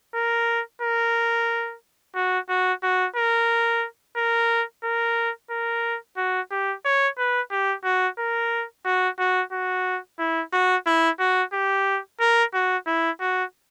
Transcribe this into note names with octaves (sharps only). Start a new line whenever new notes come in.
A#4
A#4
F#4
F#4
F#4
A#4
A#4
A#4
A#4
F#4
G4
C#5
B4
G4
F#4
A#4
F#4
F#4
F#4
E4
F#4
E4
F#4
G4
A#4
F#4
E4
F#4